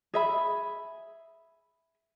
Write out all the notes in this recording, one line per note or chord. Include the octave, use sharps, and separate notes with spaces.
G#4 E5 B5